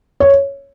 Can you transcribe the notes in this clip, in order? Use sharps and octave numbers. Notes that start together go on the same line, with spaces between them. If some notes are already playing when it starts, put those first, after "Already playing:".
C#5